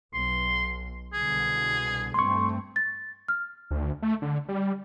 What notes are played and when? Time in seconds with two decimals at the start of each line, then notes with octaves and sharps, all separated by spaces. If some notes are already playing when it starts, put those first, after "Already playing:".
0.14 B1 C6
1.13 C2 B2 D3 G#4
2.14 G2 A3 C4 C6 C#6
2.76 A6
3.28 F6
3.71 D2
4.02 A3
4.22 D3
4.48 G3